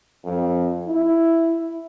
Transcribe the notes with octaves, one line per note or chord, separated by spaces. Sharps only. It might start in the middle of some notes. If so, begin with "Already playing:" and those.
F2
E4